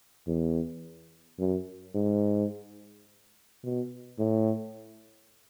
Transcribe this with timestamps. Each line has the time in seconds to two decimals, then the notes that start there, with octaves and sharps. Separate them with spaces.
0.27 E2
1.39 F#2
1.95 G#2
3.64 B2
4.19 A2